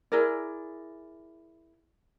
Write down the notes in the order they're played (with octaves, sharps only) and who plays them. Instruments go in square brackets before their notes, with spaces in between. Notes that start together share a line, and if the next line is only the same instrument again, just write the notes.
[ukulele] E4 G#4 A#4 D5